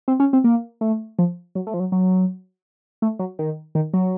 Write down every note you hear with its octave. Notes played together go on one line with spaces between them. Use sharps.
C4
C#4
C4
A#3
A3
F3
F#3
A3
F3
F#3
F#3
A3
F#3
D#3
D#3
F#3